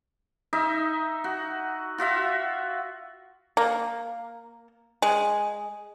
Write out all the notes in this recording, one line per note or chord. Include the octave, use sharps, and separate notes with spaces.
D#4 D#5 E5
F#4
F4 F#4 E5 F5
A#3
G#3